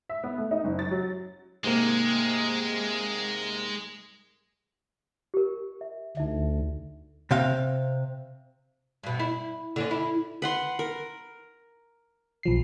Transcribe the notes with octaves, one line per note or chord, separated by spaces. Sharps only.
E5
B3
A3
D#4
F#1
A6
F#3
G#2 C3 G#3 A#3
G4 A#4
E5
D2 D#4 E5
C3 C4 F5
G2 B2
E4
D3 C4 C#4
E4
B4 F#5 C6
A#4
B1 F3 C7